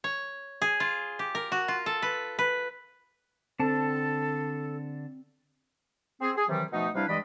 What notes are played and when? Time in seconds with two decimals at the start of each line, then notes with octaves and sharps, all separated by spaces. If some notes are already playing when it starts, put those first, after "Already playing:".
0.04 C#5
0.62 G#4
0.80 F4
1.19 G4
1.35 A#4
1.52 F#4
1.68 F4
1.86 A4
2.02 B4
2.39 B4
3.60 D3 C4 A4 A5
6.21 C4 G#4
6.36 G#4
6.49 C3 D#3 E3 F#3 G3
6.72 B2 F3 A3 D#4
6.94 C3 G3 D4 E4 B4 F5
7.07 G2 E3 G#3 D5 D#5 B5